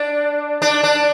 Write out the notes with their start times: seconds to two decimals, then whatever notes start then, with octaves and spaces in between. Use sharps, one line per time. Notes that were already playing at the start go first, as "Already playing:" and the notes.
Already playing: D4
0.62 D4
0.84 D4